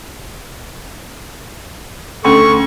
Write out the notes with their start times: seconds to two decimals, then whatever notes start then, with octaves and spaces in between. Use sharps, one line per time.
2.25 D2 C#4 A4 C6 C#6